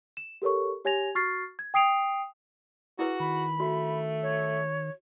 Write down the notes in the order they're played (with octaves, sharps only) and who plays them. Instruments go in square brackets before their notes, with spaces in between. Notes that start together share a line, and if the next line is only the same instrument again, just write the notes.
[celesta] E7
G4 A4 A#4 C#5 C#6
G4 C#5 G#5 G#6 A#6 F7
F#4 C#6 F6 A6 C7
G#6
G5 D#6 C7 D7 F7
[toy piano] E4 G#4 B4 [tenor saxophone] F#4
[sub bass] D#3 [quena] B5
[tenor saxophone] A3 [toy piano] F#4
[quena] C#5